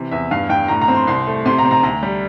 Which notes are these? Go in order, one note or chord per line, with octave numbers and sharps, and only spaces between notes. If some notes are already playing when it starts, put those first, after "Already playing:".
Already playing: C3 E3
E2 E5
G2 F5
G2 G5
A2 A#5
A#5
C4
C6
C2 C6
A3
C3 C6
A#5
C4
A#5
D2 A#5
G3